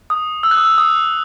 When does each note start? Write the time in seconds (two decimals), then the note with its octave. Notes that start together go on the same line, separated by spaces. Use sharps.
0.10 D#6
0.43 E6
0.51 F#6
0.57 D#6
0.64 E6
0.78 D#6